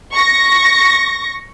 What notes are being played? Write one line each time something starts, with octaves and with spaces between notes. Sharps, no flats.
C#6 A#6